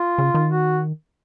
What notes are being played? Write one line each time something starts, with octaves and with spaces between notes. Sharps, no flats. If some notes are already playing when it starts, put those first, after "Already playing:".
Already playing: F4
C#3
D#3
F#4